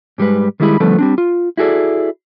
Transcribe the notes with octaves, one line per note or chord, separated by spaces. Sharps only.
G#2 G3 G#3 B4
D#3 G3 G#3 E4 G#4 B5
D3 F3 G3 A3 B3 A4
G3 C4 D4
F4
E4 F#4 G#4 A4 D5